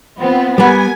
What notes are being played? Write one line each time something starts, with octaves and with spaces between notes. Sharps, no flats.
B3 C4 F4
G3 B3 A#4 G#5